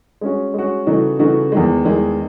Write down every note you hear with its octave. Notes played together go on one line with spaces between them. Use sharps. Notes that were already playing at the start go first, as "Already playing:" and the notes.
G#3 C#4 F#4
G#3 C#4 F#4
C#3 E3 A3 D#4 F#4
C#3 E3 A3 D#4 F#4
E2 D#3 G#3
E2 D#3 G#3